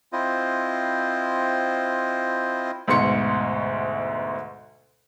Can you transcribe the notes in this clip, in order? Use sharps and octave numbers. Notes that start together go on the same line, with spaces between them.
C4 E4 F4 C5 D#5
D2 G#2 B2 C6 C#7